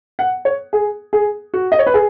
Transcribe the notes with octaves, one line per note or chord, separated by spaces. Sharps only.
F#5
C#5
G#4
G#4
F#4
D#5
C#5
B4
G#4